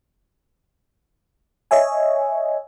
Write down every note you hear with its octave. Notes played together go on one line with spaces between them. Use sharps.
C#5 D#5 E5 G#5